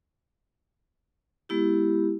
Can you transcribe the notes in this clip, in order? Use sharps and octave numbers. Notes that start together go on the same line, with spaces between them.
G#3 B3 E4 G4